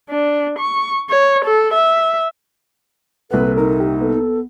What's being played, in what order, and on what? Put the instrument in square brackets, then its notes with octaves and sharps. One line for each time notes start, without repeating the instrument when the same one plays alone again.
[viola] D4
C#6
C#5
A4
E5
[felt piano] C2 A#2 F#5 [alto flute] A4 [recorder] B4
[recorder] D#4 [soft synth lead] A#4
[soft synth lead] G4
[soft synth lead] B3 [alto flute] A4